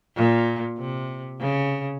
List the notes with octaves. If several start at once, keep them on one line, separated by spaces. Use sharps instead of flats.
A#2
C3
C#3